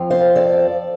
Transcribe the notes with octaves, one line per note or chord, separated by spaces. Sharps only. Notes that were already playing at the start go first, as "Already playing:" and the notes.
Already playing: F2 F3 C4 F4
C5 F5
A4 D5